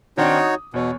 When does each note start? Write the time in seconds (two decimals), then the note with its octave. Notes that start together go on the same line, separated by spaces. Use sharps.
0.18 D#3 C4 D4 D#4 F#4 C#5
0.37 D#6
0.74 E2 B2 C#5